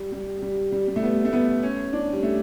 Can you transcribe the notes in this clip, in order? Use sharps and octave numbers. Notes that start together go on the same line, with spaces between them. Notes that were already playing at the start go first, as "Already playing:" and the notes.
Already playing: G3
G3
G3
G3
G3
A3
B3
A3
B3
C#4
D4
G3
A3